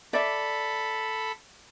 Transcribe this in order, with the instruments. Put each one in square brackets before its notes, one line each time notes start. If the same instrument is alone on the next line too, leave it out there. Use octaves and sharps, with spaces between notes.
[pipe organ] A4 B5 [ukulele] D5 E5